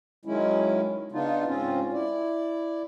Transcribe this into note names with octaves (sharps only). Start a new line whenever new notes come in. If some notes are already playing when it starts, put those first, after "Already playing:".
D#3 F#3 G#3 C#4 E4
C#3 B3 D4 D#4 F4
G#2 C4 C#4 F4
E4 D5